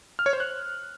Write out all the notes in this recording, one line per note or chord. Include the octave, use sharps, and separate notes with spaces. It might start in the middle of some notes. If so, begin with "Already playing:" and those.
F6
C#5
C5
F#6